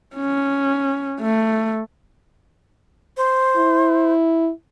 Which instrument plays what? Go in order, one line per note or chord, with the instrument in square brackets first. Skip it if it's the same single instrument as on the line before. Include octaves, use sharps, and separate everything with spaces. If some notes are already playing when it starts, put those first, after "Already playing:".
[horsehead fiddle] C#4
A3
[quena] C5
[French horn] E4